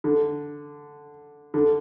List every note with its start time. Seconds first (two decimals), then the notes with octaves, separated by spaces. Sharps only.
0.04 D3
1.54 D3